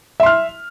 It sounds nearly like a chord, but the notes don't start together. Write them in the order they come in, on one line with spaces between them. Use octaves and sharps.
E5 C6 F6